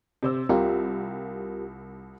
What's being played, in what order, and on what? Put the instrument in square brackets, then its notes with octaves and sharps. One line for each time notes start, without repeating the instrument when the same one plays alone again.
[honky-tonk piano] C3 C5 E6
[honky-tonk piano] C2 [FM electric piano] F4 G4 A#4